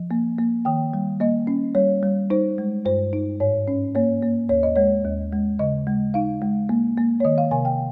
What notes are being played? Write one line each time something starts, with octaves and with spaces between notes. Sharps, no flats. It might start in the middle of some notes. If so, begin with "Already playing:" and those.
Already playing: F3
A#3
A#3
D#3 G5
G3
A#3 D#5
C#4
G3 C#5
G3
D#4 C5
G#3
G2 C5
D#4
G#2 C#5
C#4
A#3 C#5
A#3
D#2 C#5
D#5
G#3 C#5
D#2
G#3
C#3 D#5
G#3
D#4 F5
G#3
A#3
A#3
C#5
D#3 D#5
F5
C3 G#5
G5